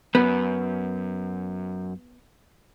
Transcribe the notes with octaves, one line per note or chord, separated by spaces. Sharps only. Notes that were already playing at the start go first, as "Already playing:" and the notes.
F#2 B3